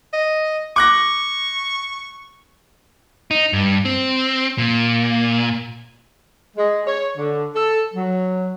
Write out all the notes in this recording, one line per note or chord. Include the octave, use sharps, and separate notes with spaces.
D#5
C#6 D6 F#6 A#6
D#4
G2
C4
A#2
G#3
C#5
D3
A4
F#3